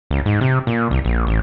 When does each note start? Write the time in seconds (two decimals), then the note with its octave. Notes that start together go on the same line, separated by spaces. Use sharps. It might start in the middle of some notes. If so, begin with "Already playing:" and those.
0.11 C#2
0.26 G#2
0.41 C3
0.67 A#2
0.91 C2
1.05 A#1
1.27 A1